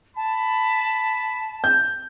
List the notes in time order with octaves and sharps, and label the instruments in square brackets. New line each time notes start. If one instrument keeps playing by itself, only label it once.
[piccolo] A5 [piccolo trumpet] B5
[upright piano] G6